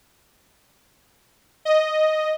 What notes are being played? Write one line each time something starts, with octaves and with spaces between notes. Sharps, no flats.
D#5